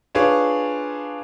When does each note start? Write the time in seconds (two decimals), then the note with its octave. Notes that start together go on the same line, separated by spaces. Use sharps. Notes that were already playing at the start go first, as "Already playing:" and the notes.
0.15 D4 F4 G#4 B4 C#5